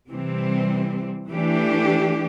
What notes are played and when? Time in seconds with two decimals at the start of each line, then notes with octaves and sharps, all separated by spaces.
0.10 C3 E3 G3 C4
1.30 E3 A3 D4 G4